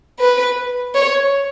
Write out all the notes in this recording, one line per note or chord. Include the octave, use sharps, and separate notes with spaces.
B4
C#5